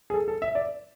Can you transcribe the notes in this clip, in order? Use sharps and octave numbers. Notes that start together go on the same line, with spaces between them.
G#4
A4
A4
E5
D5